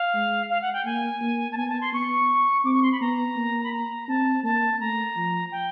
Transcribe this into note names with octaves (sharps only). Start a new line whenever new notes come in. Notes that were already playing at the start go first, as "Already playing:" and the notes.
Already playing: F5
G#3
F5
F#5
G5
A#3 G#5
A#3
A5
B3 G#5
A5
C6
B3 C#6
C4 D6
C#6
C6
B5
B3 A#5
A#3
B5
A#5
C4 A5
A#3 A5
A3 A#5
F3
G5